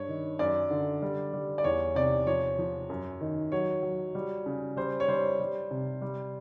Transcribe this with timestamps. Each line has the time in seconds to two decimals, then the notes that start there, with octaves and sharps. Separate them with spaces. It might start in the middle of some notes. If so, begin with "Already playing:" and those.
Already playing: G2 C#5
0.08 D#3
0.39 F#2 D5
0.71 D3
1.02 G3
1.33 G3
1.58 D5
1.64 E2 C#5
1.95 C3 D5
2.26 F3 C#5
2.59 F3
2.90 F#2
3.21 D#3
3.52 F#3 C#5
3.83 F#3
4.15 G3
4.46 C#3
4.77 G3 C5
5.00 C#5
5.08 G3 C5
5.40 G3
5.71 C3
6.02 G3